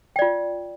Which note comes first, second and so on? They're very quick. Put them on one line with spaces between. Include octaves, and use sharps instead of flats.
G5 D5 F4